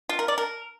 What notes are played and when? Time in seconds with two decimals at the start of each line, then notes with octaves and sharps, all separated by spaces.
0.09 F4
0.19 A#4
0.28 D5
0.38 A#4